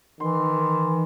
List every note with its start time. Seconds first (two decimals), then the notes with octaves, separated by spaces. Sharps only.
0.20 D#3 E3 C6